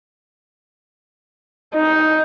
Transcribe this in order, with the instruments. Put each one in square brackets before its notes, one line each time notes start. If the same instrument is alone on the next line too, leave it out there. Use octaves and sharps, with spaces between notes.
[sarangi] D#4